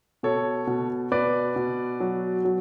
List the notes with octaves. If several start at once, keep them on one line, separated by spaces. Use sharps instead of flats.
B2 A4 C#5
B2
B2 B4 D5
B2
F#3
F#3